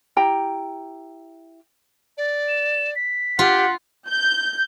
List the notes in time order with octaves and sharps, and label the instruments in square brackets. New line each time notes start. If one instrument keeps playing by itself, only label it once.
[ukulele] E4 G4 G5 A#5
[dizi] D5
[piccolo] E7
B6
[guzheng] F4 [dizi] G4 [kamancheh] F#5
[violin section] G6